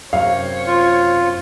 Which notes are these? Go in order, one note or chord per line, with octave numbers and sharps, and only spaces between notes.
F#2 C3 C5 C#5 F5
F4